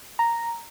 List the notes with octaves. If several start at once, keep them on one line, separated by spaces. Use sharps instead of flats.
A#5